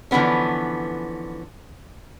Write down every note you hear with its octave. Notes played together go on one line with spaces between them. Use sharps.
D3 E3 F3 B3 C#4